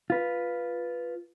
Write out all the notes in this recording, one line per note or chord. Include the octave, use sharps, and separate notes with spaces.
F4 B4